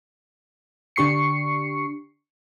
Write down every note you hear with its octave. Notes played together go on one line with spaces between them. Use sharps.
D3 D4 G4 C#6 C7 C#7